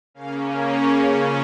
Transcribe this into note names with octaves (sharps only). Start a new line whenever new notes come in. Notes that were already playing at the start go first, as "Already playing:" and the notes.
C#3 A#3 C#4 F5
C#5
C#3 F3 C#4